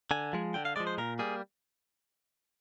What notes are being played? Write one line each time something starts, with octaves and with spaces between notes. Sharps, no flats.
D3 G#5
F3 G#3
D3 G5
F5
F3 G#3 D5
C5
A#2 A#4
G3 A#3 G#4